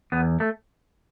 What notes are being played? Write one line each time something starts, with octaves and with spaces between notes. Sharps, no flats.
E2 B3
A3